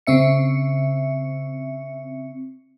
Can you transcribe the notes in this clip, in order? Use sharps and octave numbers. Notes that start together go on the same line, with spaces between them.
C#3 C4 E5 C#7